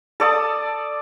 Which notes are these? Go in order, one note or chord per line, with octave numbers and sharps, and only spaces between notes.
A4 D5 A5 D#6